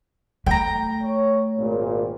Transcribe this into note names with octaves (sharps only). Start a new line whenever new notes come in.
A3 G5 A#5
C#5
G#1 A#2